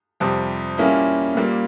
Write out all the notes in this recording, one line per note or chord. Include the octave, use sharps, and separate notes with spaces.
F2 C3 G3
A#2 G3 A#3 C#4 E4
A#2 G3 A#3